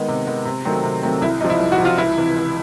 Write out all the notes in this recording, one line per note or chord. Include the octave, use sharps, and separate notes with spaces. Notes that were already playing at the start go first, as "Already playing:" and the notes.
Already playing: D#3 G#3 B3 D#4
C3
D#3 G#3 B3
C3
D#3 F#3 A3 C4
C3
D#3 F#3 A3 C4
C2 E4
C3 F3 D#4
E4
C2
F#4
C3 F3
F4
C#2 E4
C3 E3
C#2